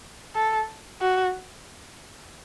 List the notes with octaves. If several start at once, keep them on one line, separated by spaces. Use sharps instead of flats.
A4
F#4